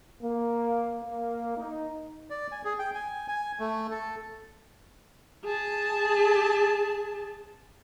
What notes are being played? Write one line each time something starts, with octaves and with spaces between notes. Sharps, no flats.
A#3
A#3
D#4
D5
G#5
G#4
G5
G#5
G#5
A3
A4
G#4 A5